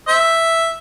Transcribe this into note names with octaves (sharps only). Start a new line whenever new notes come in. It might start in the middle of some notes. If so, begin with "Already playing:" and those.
C5 E5